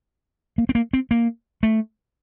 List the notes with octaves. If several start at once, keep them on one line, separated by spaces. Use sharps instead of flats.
A#3
C4
A#3
C4
A#3
A3